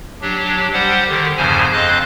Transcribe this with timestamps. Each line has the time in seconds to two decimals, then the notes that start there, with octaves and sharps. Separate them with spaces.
0.22 F#3 D4 G4
0.73 G3 G4 C5 F#5
1.08 D3 D#3 G4
1.37 E2 G2 C#3 F3 C5 G#5
1.72 F2 C5 D#5 F5 F#6